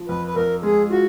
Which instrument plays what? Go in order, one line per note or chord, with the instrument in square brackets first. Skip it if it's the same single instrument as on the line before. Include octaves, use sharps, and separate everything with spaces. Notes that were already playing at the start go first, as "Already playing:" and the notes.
Already playing: [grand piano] F3
[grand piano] F2 [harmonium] B4
[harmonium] B4
[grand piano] F2 [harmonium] A#4
[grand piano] G#3 [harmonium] G#4
[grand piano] F4 [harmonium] F#4